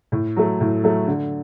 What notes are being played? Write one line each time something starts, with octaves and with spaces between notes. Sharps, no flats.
A2
F#3 A3
A2
F#3 A3
D3